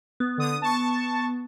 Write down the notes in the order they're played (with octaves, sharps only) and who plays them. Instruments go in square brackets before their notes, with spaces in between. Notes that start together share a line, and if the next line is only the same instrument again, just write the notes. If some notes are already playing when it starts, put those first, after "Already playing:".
[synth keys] B3
[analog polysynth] D3 D#6
A5 C#6